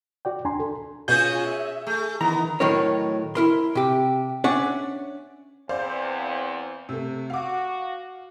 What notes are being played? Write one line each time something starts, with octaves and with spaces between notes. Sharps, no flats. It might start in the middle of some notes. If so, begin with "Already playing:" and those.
F#4 D5 G5
D#2 D4 G#5 A#5 C6
A4
B2 C#4 F4 F#4 G#4 G#5 G6
E5
A3 G#4
D#3 E3 B3 A#5
A2 D#3 F#3 D#4 A#4 C#5
E4 A#4 C6
C3 G4
C#4 D4 D5 E5 F#5
E2 C4 C5 D5 F5
C3 A3
F#4 F5 D6